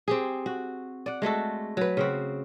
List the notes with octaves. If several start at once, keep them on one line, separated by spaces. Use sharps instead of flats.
C4 G4 G#4
F#4
D5 F#5
G#3 A3 F#4 A4
F#3 B4
C#3 C4 F#4